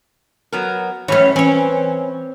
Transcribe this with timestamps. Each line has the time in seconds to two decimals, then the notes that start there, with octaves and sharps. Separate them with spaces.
0.52 F#3 B3 A#4
1.08 F#2 A2 E3 C#4 C#5
1.36 E3 C4 C#4 C#5